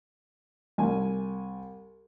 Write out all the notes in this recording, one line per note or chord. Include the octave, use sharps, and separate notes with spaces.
C2 G#5